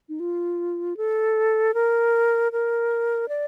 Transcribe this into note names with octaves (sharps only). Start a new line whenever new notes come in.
D#4
F4
A4
A#4
A#4
D5